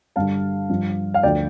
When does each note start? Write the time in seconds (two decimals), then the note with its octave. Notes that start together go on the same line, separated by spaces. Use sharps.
0.16 G2 D3 G3 F5 A5
0.69 G2 F3
1.14 F5
1.23 D2 D3 F3 D5 G5